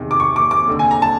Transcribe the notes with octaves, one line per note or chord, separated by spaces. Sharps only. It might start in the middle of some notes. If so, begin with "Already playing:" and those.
Already playing: E2 C3 D#3
D6
C#6
D6
D6
F1 D#2 D3
G#5
A#5
A5